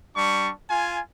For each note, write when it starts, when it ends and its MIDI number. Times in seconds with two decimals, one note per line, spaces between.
0.15 0.51 55
0.15 0.51 62
0.15 0.51 85
0.69 1.00 65
0.69 1.00 80